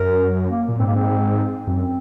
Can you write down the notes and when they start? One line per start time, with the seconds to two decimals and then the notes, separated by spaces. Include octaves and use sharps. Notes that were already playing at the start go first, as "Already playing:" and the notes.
Already playing: F#2 A#4
0.50 A#3
0.68 A#2
0.79 G#2 C4
0.87 A#3
0.96 C4
1.67 F#2 C4